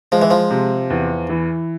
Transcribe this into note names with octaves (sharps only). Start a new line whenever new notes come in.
F3 G#3
E3
F3
C3
E2
E3